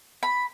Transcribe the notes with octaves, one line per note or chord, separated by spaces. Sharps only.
B5